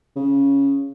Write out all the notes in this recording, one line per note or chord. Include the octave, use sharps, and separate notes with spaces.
C#3